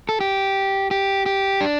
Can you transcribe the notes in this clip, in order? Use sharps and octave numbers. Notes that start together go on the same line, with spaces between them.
A4
G4
G4
G4
D4